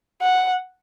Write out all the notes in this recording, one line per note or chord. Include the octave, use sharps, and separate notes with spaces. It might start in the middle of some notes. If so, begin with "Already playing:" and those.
F#5